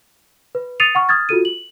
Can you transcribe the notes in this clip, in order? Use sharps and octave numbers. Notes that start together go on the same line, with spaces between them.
B4
D#6 A6 C7 C#7 D#7 F7
F#5 C#6 F6
D#6 F6 G#6 A6
F4 F#4 A4 D#7
F#7